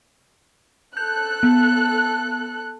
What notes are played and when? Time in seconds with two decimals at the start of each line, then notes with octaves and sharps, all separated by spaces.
0.97 A4 F#6 G6
1.43 B3